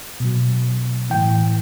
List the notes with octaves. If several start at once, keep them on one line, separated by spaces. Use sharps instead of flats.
B2 F#3
A2 E3 G5